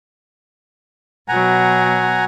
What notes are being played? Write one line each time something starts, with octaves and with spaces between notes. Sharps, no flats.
B2 F#3 F#5 G#5 A#5